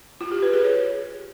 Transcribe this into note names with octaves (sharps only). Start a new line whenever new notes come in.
F4
G4
B4
G#4
C#5